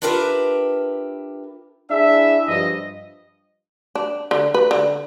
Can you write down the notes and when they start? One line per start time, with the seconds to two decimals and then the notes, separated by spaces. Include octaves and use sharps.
0.02 D4 F4 G4 A#4 B4 E5
1.91 D4 E4 G#4 E5
2.48 G2 F3 G3 D#5
3.95 D4
4.31 D3
4.54 B4
4.71 D3